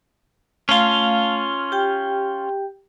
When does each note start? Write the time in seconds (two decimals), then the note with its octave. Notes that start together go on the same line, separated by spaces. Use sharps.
0.69 A3 C#4 F4 F5
1.72 G4 G5